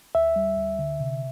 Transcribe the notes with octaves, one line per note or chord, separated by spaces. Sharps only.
D2 E5
G3
D2
D3
C3